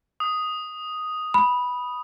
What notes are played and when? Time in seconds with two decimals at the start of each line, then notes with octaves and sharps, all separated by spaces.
0.20 D#6
1.34 B5